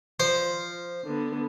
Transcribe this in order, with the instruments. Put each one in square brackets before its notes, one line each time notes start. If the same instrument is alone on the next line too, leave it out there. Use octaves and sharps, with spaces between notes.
[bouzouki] F3 [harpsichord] C5
[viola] D3 B3